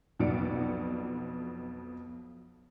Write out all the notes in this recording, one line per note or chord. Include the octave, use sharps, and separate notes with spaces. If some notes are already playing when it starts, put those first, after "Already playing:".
B1 F2 B2 D5 C#7 D7